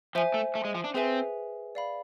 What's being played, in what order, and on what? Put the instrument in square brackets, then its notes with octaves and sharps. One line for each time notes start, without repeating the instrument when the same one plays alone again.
[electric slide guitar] F3 [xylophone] C5 E5 G#5
[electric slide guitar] A3
A3
G#3
F3
D4
[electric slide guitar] C4 [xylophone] G#4 B4 E5 G#5
[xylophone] D5 F5 B5